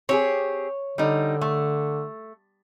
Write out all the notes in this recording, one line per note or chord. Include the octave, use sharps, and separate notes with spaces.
C4 G4 G#4 C#5
D3 G3 D#4
A3